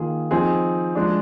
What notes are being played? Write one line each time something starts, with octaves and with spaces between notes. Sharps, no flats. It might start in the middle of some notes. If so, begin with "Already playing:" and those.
Already playing: D#3 A#3 F4 G#4
F3 C4 D#4 G#4
F3 G#3 D4